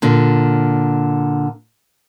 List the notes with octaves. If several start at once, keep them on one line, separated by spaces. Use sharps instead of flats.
A#2 D3